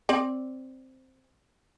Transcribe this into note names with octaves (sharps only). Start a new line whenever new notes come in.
C4 D5